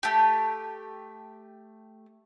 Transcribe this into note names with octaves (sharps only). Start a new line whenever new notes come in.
A3 G4